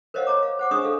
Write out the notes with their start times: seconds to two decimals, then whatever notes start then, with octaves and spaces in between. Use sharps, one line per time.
0.14 A#4 C5 C#5 D#5 F5 F#5
0.27 C#5 D5 A#5 D6
0.43 F5
0.59 C5 F#5 D6
0.71 D4 G#4 C5 D#5 C#6 D#6
0.83 D4 A4 F5